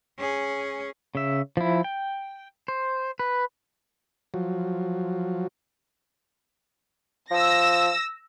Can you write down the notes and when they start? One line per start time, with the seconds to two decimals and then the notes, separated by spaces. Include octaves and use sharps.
0.18 C#4 G#4
1.15 C#3 E5
1.57 F3 E4
1.84 G5
2.68 C5
3.19 B4
4.34 F3 F#3
7.31 F3 E6 A#6